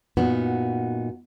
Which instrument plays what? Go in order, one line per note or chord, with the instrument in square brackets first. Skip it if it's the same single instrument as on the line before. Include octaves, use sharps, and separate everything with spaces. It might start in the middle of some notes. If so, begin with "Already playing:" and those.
[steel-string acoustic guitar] F#2 A#2 B3 D#4 F#4